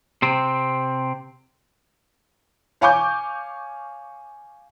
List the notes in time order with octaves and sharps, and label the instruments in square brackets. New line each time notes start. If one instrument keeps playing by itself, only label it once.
[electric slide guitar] C3 C4
[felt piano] C#5 F5 G#5 C#6 D6 G6